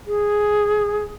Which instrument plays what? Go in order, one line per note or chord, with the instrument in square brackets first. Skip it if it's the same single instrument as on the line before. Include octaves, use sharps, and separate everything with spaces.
[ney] G#4